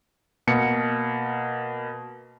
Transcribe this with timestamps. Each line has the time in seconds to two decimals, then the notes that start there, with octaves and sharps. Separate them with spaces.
0.47 B2 A#3 C#7